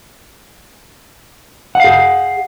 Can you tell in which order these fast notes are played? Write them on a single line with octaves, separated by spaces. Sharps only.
F#5 F5 G#4